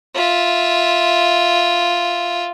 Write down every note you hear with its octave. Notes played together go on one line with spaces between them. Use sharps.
F4 E5